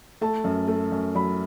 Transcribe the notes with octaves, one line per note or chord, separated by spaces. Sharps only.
A3 A5
F#2
A3
F#2
F#3 B5